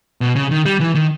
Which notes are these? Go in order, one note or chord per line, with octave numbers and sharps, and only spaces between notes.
B2
C#3
D#3
G3
E3
D#3